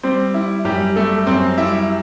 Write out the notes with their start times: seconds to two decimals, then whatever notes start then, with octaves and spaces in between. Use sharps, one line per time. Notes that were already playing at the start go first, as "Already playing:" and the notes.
0.03 G3 C4 C5
0.34 G3 E4
0.65 F#2 G3 G4
0.96 G3 A3 A4
1.27 F#2 C4 C5
1.58 G3 E4 E5